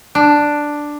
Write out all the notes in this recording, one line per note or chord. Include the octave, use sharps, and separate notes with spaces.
D4